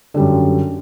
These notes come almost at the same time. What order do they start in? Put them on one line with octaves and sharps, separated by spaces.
D3 G3 F#2